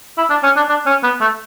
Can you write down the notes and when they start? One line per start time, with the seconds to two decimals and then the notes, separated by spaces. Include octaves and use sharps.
0.18 E4
0.30 D4
0.43 C#4
0.56 D4
0.69 D4
0.86 C#4
1.03 B3
1.21 A3